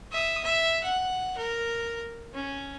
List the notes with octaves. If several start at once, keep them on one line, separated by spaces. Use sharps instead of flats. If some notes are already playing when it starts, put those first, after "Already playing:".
E5 D#6
E5
F#5
A#4
C#4